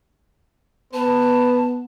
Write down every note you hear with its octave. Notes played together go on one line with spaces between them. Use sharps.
B3 B4 A5